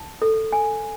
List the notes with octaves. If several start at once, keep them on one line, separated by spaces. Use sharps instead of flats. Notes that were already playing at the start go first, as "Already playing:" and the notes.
Already playing: A5
A4
G#5